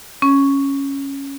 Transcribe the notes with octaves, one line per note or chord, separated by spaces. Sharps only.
C#4